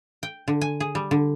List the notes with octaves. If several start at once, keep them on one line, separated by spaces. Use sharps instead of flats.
G5
D3
G#5
G#4
G3
D3